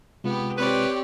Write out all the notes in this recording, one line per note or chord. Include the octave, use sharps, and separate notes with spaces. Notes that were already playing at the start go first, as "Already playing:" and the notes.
C3 G#3 B3 F4 G4
C4 G4 B4 C#5 D5